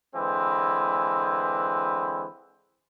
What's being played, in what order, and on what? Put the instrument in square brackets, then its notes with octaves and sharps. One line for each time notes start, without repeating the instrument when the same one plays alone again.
[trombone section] D3 E3 G#3 C4 B4